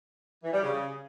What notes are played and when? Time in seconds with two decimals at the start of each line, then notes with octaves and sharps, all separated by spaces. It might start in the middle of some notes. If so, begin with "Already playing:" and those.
0.43 E3
0.53 G3
0.63 C#3